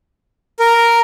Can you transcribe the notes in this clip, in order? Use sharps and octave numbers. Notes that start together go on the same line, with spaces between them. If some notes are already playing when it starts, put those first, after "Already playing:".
A#4